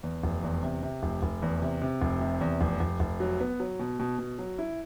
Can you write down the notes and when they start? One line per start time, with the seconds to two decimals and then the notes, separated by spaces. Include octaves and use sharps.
0.03 E2
0.23 F1
0.43 E2
0.63 C3
0.83 C3
1.03 F1
1.23 F1
1.42 E2
1.62 C3
1.82 C3
2.02 F1
2.21 C3
2.41 E2
2.61 F1
2.80 F1
3.00 F1
3.20 F#3
3.40 B3
3.60 F#3
3.79 B2
4.00 B2
4.19 B2
4.39 F#3
4.58 E4